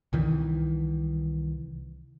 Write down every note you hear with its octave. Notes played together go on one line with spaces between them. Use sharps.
C2 D#3 E3